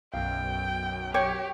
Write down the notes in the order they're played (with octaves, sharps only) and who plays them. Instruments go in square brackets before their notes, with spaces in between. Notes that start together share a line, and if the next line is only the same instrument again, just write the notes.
[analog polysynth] B1 F#2 [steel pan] F5 [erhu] G5
[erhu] G4 [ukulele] C#5 [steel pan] G5 D6